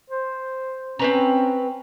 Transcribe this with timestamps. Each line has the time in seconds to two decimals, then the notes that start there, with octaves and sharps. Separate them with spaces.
0.10 C5
0.99 C4 C#4 B4 A#5